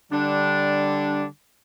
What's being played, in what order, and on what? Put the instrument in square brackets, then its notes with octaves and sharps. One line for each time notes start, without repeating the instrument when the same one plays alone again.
[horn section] D3 G3 D4